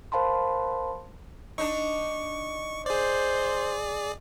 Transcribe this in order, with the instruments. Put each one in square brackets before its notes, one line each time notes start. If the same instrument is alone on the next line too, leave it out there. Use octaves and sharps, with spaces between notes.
[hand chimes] A#4 C5 F5 A5 B5 C6
[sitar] D4 D#4 [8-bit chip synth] C#6
[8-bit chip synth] G#4 D5 [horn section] C5